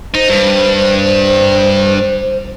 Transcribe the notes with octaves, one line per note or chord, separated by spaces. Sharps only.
D#4 C5
G2